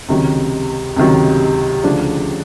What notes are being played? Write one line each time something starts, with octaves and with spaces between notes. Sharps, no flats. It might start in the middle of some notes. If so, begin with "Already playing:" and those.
C#2 C3 D#3 F#3
C#2 C3 D#3 F#3
D2 C#3 F3 D4